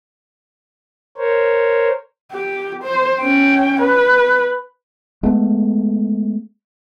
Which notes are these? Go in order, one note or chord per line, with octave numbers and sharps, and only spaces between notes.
A#4 C5 C#5
G4
C5
C#4 G5
B4
G#3 A3 B3